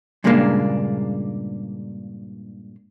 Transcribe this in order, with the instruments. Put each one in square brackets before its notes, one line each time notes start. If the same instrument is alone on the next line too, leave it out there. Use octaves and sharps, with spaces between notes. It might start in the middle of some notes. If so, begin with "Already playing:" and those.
[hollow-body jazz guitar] G2 A#2 C#3 G#3 A#3 D4